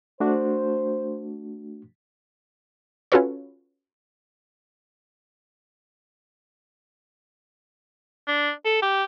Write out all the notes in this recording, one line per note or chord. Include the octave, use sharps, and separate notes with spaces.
A3 D4 F#4 C5
C#4 F4 F#4 A4 B4 C#5
D4
A4
G4